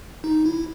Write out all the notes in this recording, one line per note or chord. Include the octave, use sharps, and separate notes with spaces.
D#4
E4